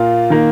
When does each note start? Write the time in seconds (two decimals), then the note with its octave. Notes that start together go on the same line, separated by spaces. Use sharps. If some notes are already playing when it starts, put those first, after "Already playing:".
Already playing: A#2 A#3 F4
0.30 D#3 A#3